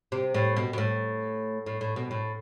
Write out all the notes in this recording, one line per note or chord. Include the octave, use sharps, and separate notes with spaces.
C3
A2
B2
B2
A2
A2
A2
B2
A2